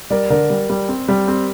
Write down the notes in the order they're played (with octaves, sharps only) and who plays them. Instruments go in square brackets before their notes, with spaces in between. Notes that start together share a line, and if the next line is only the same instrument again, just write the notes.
[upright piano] G3 [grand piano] A#4 D5
[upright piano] D3 [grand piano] A#4 D5
[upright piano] G3
G3
C4
G3
C4